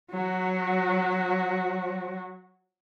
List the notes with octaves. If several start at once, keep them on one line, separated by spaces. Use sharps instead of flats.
F#3 F#4